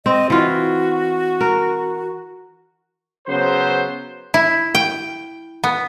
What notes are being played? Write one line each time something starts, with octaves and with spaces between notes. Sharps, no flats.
C4 D#5
E3 F4 F#4
A#4
C#3 F#3 B3 C5
E4
G5
B3